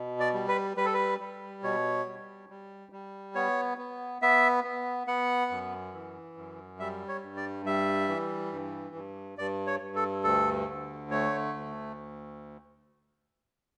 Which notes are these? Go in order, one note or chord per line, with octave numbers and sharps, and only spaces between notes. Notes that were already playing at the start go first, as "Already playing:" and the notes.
Already playing: B2
D5
G3
B4
G3 B4
A4
B4
G3
B2 C#5
G3
G3
G3
B3 C#5
B3
B3 E5
B3
B3 F#5
F#2
E3
F#2
G3 E5
C#5
G2
D5
G3 E5
E3
G2
G2
G2 D5
C#5
G2
A4
D2 A4
D3
A3 C#5
D2